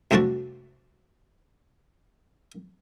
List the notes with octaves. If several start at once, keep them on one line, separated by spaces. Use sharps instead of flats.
C2 F2 A3 D4 F#4 A5